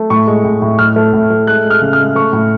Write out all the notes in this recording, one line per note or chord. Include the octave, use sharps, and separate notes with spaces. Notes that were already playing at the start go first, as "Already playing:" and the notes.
Already playing: A3
A2 C#6
G#3
A2
A2
A2 F6
A3
A2
A3
G#3 F#6
G#3
F6
C#3
F6
G#3
A3 C#6
A2